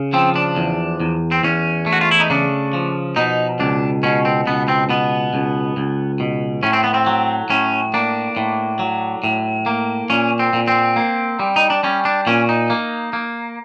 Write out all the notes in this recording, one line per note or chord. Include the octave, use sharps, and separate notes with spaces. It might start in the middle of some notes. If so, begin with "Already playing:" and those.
Already playing: C#3
F3 C4
D4
E2
E2
C4
E2 C#4
A3
F#4
F4
E4
D#4
C#3 D4
F3
B2 D#4
C#2 D4
B2 C#4
C4
C#2 B3
C4
B2 B3
C#2
C#2
B2
A2 C#4
C4
B3
C4
F#3
A2 C#4
A#3 D4
A2
F#3
A2
A#3
A#2 C#4
C4
A#2
C4
A#3
G3
D#4
D4
G3 C#4
D4
A#2 C#4
D#4
A#3
A#3